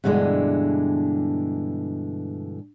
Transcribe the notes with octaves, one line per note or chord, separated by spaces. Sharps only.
G2 B2 D3 E3 G#3 D4